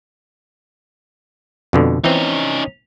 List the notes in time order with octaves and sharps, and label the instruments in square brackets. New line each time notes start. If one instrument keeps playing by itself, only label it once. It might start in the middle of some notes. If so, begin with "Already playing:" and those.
[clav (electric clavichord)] F2 B2 D3
[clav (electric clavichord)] E3 C4 [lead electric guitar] C#4 D#4